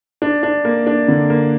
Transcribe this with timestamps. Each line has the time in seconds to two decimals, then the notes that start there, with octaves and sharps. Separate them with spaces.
0.22 D4
0.43 D4
0.65 A#3
0.87 D4
1.08 D3
1.30 A#3